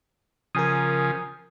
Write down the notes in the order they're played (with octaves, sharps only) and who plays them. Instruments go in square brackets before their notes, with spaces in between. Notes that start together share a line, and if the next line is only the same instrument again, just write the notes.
[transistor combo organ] C#3 F3 [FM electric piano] A#4 G#5 D#6